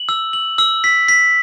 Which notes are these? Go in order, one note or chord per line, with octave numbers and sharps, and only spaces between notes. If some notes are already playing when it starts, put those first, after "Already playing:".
Already playing: F#7
E6
F#7
E6
B6
B6